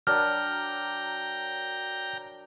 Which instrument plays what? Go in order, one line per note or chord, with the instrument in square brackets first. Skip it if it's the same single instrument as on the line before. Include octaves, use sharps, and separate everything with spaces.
[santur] F#3 D4 A#4 [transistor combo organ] G5 A#5 [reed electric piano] F6